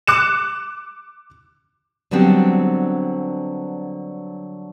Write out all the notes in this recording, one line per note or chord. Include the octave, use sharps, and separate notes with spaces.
D6 F#6 C#7 E7
D3 F#3 G3 B3 C4 D4